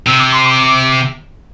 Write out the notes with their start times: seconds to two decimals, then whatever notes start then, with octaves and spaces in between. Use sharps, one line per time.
0.06 C3 E6
0.19 D6
0.32 C6
0.45 D6